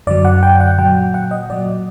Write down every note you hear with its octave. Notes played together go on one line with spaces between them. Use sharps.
F#2 D3 F#3 D5
F#5
G5
F#5
A#2 F#3 G5
F#5
D#5
A#2 F#3 D5